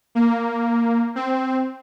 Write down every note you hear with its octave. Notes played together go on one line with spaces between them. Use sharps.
A#3
C4